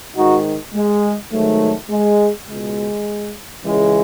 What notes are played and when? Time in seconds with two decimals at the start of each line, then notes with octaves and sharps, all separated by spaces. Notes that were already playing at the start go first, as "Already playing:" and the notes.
0.16 G#2 D#3 D#4 F#4
0.74 G#3
1.32 G#2 D#3 F#3 A3
1.90 G#3
2.48 C#2 B2 G#3
3.64 C#2 C#3 E3 G#3